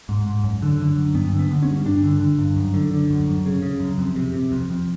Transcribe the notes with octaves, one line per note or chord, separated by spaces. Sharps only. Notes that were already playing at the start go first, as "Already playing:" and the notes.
G#2
G#2
F#2
D3
D3
F#2
G2 B3
D3
B3
D3
C#4
G2
G2 D4
D3
D3
G2
F#2
D3
D3
F#2
F#2
C#3
C#3
F#2
F2
C3
C3
F2
F2